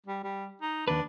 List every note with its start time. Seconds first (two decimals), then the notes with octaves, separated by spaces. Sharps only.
0.06 G3
0.24 G3
0.62 D#4
0.88 D#2 D4 B4